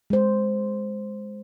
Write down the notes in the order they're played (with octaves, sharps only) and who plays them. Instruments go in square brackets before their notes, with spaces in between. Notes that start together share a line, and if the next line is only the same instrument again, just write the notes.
[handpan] G#3 C5